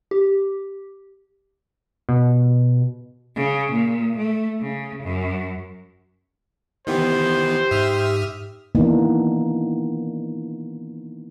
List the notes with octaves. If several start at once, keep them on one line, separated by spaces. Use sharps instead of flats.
G4
B2
C#3
A#2
A3
C#3
F#2
D#3 E3 B3 G4 C5
G#2 E5 D#6 F6
D#3 E3 A#3 B3 D4 D#4